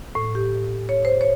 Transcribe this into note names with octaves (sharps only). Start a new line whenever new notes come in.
A2
G4
C#5
C5
C#5